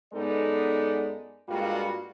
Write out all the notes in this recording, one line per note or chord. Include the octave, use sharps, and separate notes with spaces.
F#2 G#3 B3 D#4 A4 D5
G2 G3 G#3 A#3 F4 F#4